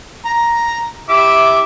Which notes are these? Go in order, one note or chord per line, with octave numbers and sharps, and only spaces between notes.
A#5
E4 G4 E5 D6